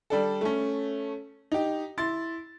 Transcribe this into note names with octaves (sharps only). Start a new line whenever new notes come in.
G3 D4 A4
A3 C#4
D#4 G4
E4 C6 A6